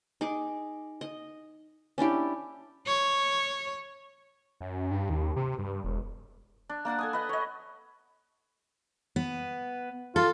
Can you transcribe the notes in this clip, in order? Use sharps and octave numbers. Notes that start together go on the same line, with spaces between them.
D#4 G#4 D6
D#5
C#4 D4 E4 G4
C#5
F#2
G2
D#2
C3
G2
E1
D4
A#3 D4 F#5 A5
A4 G#5 D#6
B4 D#5 F#5
C#5 D#5
B3
F4 A4